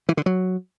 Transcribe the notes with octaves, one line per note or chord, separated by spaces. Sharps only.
E3
D3
F#3